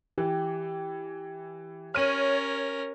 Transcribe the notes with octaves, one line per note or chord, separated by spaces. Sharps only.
E3 G4
C#4 A#4 C#5 F6 D#7